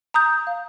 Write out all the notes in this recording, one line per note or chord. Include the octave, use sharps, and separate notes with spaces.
A#5 D#6 G6
F5